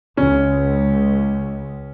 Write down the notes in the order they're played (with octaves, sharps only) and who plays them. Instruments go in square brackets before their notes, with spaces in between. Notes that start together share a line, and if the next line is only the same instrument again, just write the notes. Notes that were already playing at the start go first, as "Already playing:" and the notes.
[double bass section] C#2 [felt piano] C#4